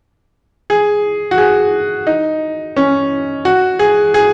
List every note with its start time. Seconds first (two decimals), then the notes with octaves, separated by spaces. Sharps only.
0.70 G#4
1.31 F#4
1.38 G#4
2.07 D#4
2.76 C#4
3.45 F#4
3.79 G#4
4.14 G#4